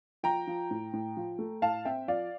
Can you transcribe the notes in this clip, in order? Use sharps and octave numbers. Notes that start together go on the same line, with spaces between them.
F3 G5 A#5
F3
A2
A2
F3
A3
A2 F5 A5
C4 E5 G5
F3 D5 F5